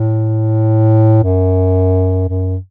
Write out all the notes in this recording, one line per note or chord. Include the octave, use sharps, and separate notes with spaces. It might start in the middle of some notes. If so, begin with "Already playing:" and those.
Already playing: A2
F#2
F#2